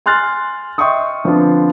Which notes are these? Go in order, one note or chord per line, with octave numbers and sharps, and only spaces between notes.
G#5 C6 F6 F#6 A6
D#5 E5 G5 C6 C#6 D#6
D3 F3 B3 C4 D4 F4